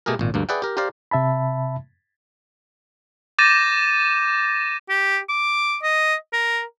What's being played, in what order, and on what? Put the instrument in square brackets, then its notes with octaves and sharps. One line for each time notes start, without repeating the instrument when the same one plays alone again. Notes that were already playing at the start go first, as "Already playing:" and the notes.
[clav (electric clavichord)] B2 A3 G4 G#4 A#4
G#1 A#2
D2 G2 A#3
G#4 B4 D5 E5 F#5 G5
G4 A#4
G4 A#4 C5 D5 F5
[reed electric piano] C3 E5 A5 B5
[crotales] D6 G6 A6 A#6 D#7 E7
[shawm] G4
D6
D#5
A#4